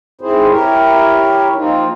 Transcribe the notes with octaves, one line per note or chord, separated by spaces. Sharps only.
G#2 C4 E4 G#4 C5
E4 G4 A#4 C#5
F3 A#3 C4 D#4 F4